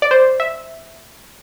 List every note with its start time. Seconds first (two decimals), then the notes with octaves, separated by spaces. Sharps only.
0.02 D5
0.11 C5
0.40 E5